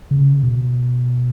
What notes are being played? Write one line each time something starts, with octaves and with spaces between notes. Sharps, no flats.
C#3
B2